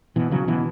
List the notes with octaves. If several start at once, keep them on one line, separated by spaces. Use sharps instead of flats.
B2 E3
C#3 F#3
B2 E3